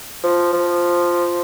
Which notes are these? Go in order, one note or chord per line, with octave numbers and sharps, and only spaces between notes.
F3
F3